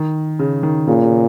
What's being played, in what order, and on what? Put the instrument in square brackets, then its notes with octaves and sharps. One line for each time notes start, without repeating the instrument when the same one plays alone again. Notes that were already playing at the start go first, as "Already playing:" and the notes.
Already playing: [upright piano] D#3
C#3
D#3
[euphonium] A#2 [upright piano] C#3
[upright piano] C#3